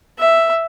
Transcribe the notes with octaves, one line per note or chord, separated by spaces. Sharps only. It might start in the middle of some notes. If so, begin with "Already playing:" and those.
E5